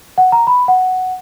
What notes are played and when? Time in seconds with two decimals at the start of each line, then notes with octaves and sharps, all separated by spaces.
0.18 F#5
0.32 A#5
0.47 B5
0.68 F#5